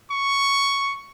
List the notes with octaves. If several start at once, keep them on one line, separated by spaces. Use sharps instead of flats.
C#6